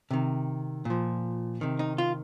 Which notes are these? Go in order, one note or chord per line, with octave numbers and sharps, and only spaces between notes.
C3 D#3
A#2 F3
C3 D#3
D#4
F4